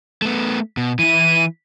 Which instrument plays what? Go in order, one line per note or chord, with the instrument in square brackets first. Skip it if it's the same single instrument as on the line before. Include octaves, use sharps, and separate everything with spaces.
[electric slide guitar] A3 B3
B2
[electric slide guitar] E3 E4 [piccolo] D#7